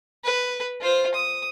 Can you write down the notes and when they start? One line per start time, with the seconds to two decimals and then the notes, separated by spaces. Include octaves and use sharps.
0.24 B4
0.81 F4 C5
1.14 D#6